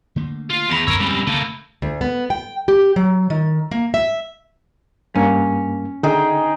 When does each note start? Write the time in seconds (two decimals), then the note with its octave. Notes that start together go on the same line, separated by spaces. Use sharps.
0.16 D3 A3 A#3
0.50 F4
0.70 E2 B5 A#6 F7
0.87 F#2 D3 C4 A#4 C#5 E6
1.00 C#3 G3 G#3 B3 C4
1.27 C#3 A3 A#3
1.82 D2
2.01 B3
2.30 G5
2.68 G4
2.96 F#3
3.30 D#3
3.71 A#3
3.94 E5
5.15 G2 A#3 C#4
6.03 D3 D#4 G#4 G5